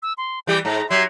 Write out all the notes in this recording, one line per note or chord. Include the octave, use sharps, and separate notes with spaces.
E6
C6
E3 G3 G4 G6
G#2 A#5
F#3 G4 E5 C6 G#6